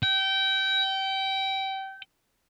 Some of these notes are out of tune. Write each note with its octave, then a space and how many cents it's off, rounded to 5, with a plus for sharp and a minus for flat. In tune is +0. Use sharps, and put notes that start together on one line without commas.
G5 -25